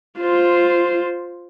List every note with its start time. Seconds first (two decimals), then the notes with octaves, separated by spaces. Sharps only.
0.20 F4 C5